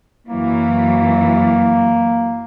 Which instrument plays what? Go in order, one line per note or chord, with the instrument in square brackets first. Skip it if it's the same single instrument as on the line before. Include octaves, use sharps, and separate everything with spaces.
[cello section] F#2 E3 F#3 [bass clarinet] A#3